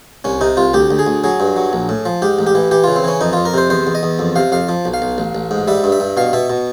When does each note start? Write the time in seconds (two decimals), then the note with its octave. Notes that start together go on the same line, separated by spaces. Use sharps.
0.24 C2 C#4
0.41 C3 D#4
0.57 C2 F4
0.74 D2 G4
0.91 D2
0.99 G#4
1.07 D2
1.24 F#3 G#4
1.40 G2
1.56 F#3
1.73 A#1
1.89 A2
2.05 F3
2.22 G#2 G4
2.39 A1
2.47 G4
2.55 E3
2.71 E3 G4
2.84 C#3 F4
2.96 C4
3.04 E3 C#4
3.21 F2 D#4
3.33 F2 F4
3.45 A#4
3.54 C3 C5
3.70 E2 C5
3.87 E2
3.95 D#5
4.03 E2
4.19 F2
4.36 C3 F5
4.52 F2 F5
4.69 F3
4.85 B1
4.94 F5
5.02 B1
5.18 A1
5.35 A1
5.51 G#2
5.68 G3 E5
5.84 G2
5.92 E5
6.00 G2
6.17 B2 F5
6.33 B2 E5
6.50 B2